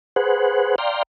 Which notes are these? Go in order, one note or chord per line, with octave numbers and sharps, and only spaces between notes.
G#4 B4 C5 F#5
D5 F5 G5 A#5 C6